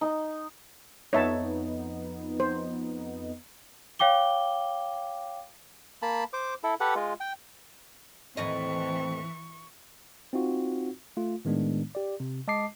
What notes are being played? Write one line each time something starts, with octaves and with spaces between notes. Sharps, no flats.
D#4
F2 B3 D#4 C#5 E5 A5
C5
C#5 F5 G5 D6 G7
A#3 A5 B5
C5 D6
E4 A4
G4 A4 B4 F#5
G#3 F4
G5
D#2 A2 E3 C4 D#5 C#6
C4 D#4 F4 F#4
A3 F4
A2 D#3 G#3 B3 D4
G4 D5
C3
G#3 D#5 A5 D6 C7